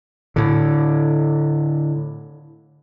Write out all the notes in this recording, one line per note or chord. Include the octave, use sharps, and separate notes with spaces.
A2 D3